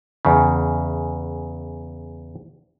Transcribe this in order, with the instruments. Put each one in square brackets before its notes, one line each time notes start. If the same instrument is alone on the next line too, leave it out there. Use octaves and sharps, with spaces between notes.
[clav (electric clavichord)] E2 C#3